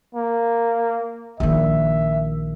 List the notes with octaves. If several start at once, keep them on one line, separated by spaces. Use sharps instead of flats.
A#3
A#1 D#3 E5